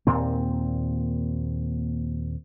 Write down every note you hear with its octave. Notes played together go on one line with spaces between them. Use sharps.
D#2 A#2 C4